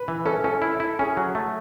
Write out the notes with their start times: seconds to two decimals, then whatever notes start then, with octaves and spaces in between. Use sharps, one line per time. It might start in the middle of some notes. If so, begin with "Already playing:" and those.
Already playing: B4
0.08 E3
0.26 C#4 A4
0.44 C#4 A4
0.62 E4
0.80 E4
0.99 C#4 G#4
1.17 F#3
1.35 A3